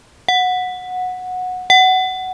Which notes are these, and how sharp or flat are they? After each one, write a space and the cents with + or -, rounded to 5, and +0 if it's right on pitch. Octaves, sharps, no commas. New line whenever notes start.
F#5 -15
F#5 +15